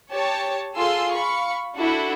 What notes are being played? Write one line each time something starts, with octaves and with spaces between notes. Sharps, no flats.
G4 C#5 A5
F4 G#4 A4 C6 E6 C7
F5 B5 C#6
D4 E4 F#4 A4